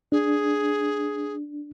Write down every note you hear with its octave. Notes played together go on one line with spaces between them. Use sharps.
D4 G#4